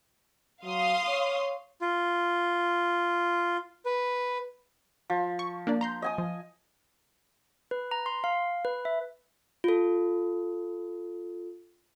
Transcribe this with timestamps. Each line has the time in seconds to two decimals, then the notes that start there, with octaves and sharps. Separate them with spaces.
0.64 F#3 F5 C6 D#6
1.08 C#5
1.81 F4
3.86 B4
5.10 F3
5.39 C#6
5.67 A#3 D4 D5
5.81 A#5 C6 G6
6.02 D#5 G#5 D#6
6.18 F3
7.71 B4
7.91 A#5
8.06 C6
8.24 F5
8.65 B4
8.85 E5
9.64 F4 A4